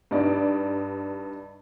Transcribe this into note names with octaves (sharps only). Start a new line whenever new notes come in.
G2 D#4 D5